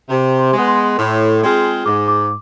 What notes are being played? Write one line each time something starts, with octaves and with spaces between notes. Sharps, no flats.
C3
C6
G#3 B3
C6
A2
G#3 C4 F4 G#4
G#2 D6
D6